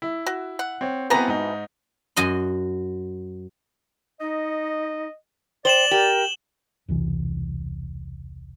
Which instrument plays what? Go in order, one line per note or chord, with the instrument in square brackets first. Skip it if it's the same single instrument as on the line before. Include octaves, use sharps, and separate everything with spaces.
[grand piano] E4
[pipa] F#4
F#5
[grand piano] C4 C#5
[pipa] B2 E3 A#5 [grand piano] B3 C4 B4
[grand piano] G#2 D#4
[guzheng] F#2 F#4 D#5 C6
[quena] D#4 [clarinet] D#5
[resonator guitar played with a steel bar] C5 [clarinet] D5 [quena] G5 [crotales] E7 F#7 G7
[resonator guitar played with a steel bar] G4 [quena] A#4
[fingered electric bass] E1 C2 E3